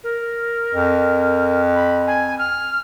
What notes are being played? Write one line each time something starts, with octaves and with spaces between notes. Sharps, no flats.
A#4
F2
B5
G#5
F6